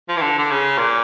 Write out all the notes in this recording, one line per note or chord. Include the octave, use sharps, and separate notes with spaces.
F3
E3
D3
D3
C#3
A#2